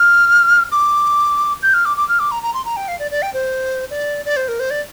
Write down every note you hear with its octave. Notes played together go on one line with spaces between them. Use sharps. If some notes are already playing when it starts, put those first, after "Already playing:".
Already playing: F6
D6
G6
F6
D6
D6
F6
D6
A#5
A#5
C6
A#5
G5
F5
D5
D5
G5
C5
D5
D5
C5
A#4
C5
D5